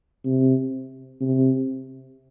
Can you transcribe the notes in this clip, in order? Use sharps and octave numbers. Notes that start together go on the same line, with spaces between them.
C3
C3